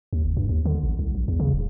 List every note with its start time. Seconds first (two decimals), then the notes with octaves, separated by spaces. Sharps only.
0.13 D#2
0.25 F#1
0.37 G2
0.49 D#2
0.65 D3
0.83 A1
0.99 C2
1.15 A#1
1.28 E2
1.40 C#3
1.53 D#1